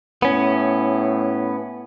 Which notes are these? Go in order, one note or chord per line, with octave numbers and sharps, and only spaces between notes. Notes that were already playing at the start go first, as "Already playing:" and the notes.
A2 B3 C#4